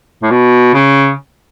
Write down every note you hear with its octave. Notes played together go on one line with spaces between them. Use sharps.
A2
B2
C#3